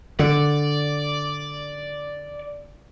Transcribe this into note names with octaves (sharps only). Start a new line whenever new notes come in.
D3 D5